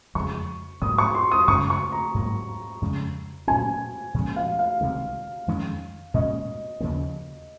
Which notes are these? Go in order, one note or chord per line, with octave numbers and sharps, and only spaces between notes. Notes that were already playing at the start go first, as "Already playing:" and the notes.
F2 C#3 G#3 C#6
G#2 F#3 A#3 D#6
C#6
C6
D#6
F#2 C#3 G#3 C#6
C#6
A#5
G#2 F#3 A#3
F2 C#3 G#3
A#2 F#3 C#4 G#5
A#2 F3 G#3 C#4
F5
F5
C2 C3 D#3 G#3
F2 D#3 G#3 C#4
A#2 G#3 C#4 D#5
D#2 C#3 F3 A#3